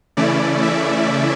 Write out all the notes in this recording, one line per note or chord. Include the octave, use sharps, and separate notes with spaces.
C#3 E3 A3 C#4 E4 D5
E5